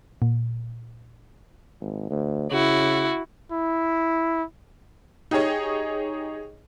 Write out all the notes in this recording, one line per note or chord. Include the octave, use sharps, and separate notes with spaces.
A#2
G#1
D2
C#3 E4 F#4
E4
D#4 G4 G#4 C#5 D#5